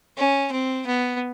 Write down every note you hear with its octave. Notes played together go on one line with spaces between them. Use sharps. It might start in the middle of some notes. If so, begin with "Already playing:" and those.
C#4
C4
B3